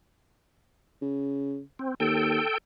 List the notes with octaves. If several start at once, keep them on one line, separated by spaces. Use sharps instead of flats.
C#3
C4
D#2 A4 G5